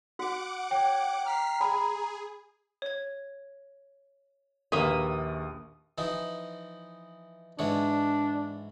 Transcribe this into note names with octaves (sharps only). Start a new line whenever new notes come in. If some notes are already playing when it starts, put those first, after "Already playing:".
F#4 F#5 D6
C#5 G5
A#5 F6 B6 C7
G#4 G#5 B5
C#5 G#6
A#1 D#2 A#3 B4 E5 D#6
E3 F3 D#4
G#2 E3 D4 C#5